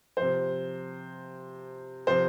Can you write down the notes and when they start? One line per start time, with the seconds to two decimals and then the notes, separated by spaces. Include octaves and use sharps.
0.17 C3 F3 C5
2.07 C3 F3 C5